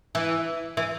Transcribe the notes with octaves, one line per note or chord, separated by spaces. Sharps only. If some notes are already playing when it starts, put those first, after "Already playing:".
E3
E3